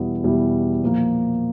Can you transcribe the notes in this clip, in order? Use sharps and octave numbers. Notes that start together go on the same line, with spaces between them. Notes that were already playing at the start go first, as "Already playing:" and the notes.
Already playing: E2 B2 G3 B3 E4
E2 B2 G3 B3 E4
A#2 F3 A#3